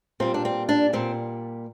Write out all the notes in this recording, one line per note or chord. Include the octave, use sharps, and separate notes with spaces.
A#2 G3 C4
D4
C4
D4
A#2 G3 C4